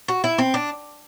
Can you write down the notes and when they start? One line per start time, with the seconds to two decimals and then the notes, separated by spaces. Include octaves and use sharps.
0.08 F#4
0.24 E4
0.38 C4
0.54 D4